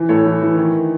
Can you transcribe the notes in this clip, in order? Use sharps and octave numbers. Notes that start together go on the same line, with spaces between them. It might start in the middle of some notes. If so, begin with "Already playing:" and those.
Already playing: E3
A2 A4 C#5
E3
E3
D#3